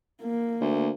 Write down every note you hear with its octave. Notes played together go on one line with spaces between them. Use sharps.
A#3
D2